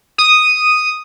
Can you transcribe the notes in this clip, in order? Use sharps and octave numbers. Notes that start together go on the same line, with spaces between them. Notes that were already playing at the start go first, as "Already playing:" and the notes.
D#6